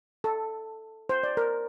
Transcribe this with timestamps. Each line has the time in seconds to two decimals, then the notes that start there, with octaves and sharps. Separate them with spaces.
0.24 A4
1.09 C5
1.23 D5
1.37 A#4